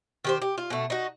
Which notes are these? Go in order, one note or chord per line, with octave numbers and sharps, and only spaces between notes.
D#3 G4 C5
G4
F4
B2 A3
D#4 F#4